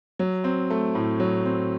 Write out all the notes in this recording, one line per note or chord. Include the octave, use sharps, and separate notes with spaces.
F#3
C4
A3
A2
F#3
C4